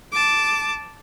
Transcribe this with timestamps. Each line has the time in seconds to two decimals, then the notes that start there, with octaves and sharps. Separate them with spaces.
0.12 A5 D6